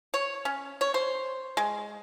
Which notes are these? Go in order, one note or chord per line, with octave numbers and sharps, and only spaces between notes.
C#5
C#4
C#5
C5
G#3